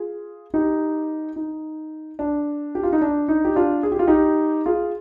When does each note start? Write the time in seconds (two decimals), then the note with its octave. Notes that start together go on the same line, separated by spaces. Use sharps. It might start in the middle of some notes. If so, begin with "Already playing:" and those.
Already playing: F4 G#4
0.54 D#4 G4
1.36 D#4
2.19 D4
2.75 G4
2.83 F4
2.92 D#4
3.01 D4
3.28 D#4
3.45 G4
3.56 D4 F4
3.83 G#4
3.92 G4
3.99 F4
4.07 D#4 G4
4.66 F4 G#4